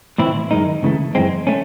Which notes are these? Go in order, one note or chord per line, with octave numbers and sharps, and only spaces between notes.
A2 E3 C4 E4
F#2 D#3 G#3 D#4
C#2 C#3 E3 A3
F#2 E3 G#3 C4
A3 C#4